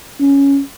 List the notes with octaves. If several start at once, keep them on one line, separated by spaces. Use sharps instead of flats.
C#4